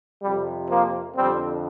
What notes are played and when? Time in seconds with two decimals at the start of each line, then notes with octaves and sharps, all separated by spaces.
0.23 F2 C3 G3
0.69 F3 A#3
1.16 F2 D3 G3 C4